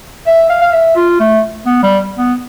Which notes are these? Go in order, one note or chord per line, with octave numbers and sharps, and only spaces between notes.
E5
F5
F5
E5
F4
A3
B3
G3
B3